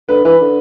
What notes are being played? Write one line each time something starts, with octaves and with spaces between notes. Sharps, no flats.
D3 B4
E3 B4
D3